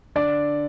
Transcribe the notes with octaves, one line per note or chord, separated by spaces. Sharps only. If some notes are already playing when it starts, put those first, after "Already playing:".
D3 D5